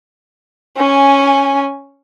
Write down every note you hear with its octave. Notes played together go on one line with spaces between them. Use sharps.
C#4 G#5